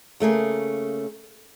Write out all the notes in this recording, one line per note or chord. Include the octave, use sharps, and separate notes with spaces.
C#3 A3 A#3 G#4